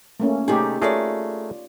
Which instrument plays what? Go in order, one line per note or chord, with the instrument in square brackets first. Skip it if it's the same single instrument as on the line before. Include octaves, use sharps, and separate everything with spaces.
[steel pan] A3 A#3 C#4
[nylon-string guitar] C3 A3 G#4 [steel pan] D#4 G4
[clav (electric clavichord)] A3 G#4 A#4 [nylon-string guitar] F4 C#5 D5